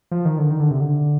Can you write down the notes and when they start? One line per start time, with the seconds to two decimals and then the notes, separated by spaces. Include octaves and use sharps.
0.11 F3
0.25 D#3
0.38 D3
0.50 D#3
0.60 D3
0.71 C3
0.81 D3